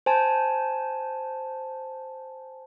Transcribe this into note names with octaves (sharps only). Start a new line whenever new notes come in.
C5 G#5 A5